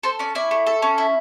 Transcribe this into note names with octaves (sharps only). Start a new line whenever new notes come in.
A4 C5
C#4 D5
E4 D5
A3
A4
C#4
E4